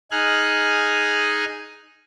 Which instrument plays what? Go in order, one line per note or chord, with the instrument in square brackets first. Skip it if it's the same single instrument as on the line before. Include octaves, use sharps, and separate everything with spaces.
[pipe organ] D#4 G#4 G#5 F6 F#6